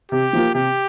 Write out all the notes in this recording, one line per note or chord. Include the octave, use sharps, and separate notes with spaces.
C3 G4
F3 A#3 F4
C3 G4